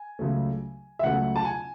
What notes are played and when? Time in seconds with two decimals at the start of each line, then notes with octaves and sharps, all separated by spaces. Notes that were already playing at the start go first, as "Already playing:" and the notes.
Already playing: G#5
0.19 C#2 C#3 F#3 A3
0.99 E5
1.03 C#2 C#3 F#3 A3 F#5
1.36 A5
1.45 G#5